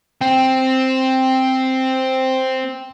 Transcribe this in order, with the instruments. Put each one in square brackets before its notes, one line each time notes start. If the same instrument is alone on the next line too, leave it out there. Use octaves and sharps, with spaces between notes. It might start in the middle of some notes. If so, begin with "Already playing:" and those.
[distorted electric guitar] C4 [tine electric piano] G5